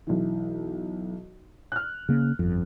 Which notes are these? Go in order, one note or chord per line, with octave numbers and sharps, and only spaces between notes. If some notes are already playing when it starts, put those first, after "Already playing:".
B1 E3
F6 F#6
C#3 A#3
G1 F2